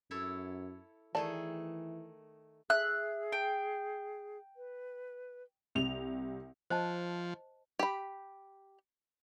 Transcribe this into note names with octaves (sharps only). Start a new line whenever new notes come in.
F#2 E4 A4 C#5
D#3 E3 A3 G#4 D5 A5
G#4 E5 F#6
G5
B4
C2 F7
F3 C5 D#5 A5
G4 B5